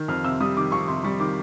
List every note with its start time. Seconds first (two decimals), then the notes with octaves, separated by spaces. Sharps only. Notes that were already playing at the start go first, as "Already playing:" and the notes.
Already playing: D#3
0.08 F2 F6
0.25 C3 E6
0.40 G3 D#6
0.57 D#3 D6
0.72 F2 C#6
0.88 C3 C6
1.03 G3 C#6
1.19 D#3 D6